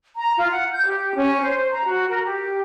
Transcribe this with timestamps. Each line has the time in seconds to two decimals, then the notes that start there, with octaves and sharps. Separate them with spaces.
0.16 A#5
0.37 F4
0.50 F#5
0.71 G6
0.86 G4
1.15 C#4
1.41 C5
1.71 A#5
1.85 F#4
2.08 A#4
2.24 G4